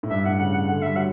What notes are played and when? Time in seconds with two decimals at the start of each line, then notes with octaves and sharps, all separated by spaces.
0.03 A2
0.10 G2 E5
0.25 A2 F#5
0.39 C#3 F#5
0.54 F#5
0.68 D3 F#5
0.77 A3
0.82 G3 E5
0.96 F#3 F#5